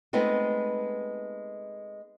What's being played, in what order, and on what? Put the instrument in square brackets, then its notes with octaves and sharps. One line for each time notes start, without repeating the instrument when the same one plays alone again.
[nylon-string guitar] G#3 A3 B3 C4 D#4